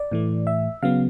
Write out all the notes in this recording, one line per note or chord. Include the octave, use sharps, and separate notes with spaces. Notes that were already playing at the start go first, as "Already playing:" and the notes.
Already playing: D5
A2 E3 A3
E5
C#3 F#3 B3 F5